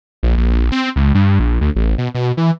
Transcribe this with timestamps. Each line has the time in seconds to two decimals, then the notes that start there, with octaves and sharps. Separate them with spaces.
0.23 A#1
0.37 A#1
0.72 C4
0.96 C#2
1.15 G2
1.39 A#1
1.61 D2
1.76 A1
1.98 B2
2.14 B2
2.37 E3